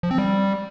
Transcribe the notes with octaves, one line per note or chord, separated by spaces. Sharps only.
F3
C4
G3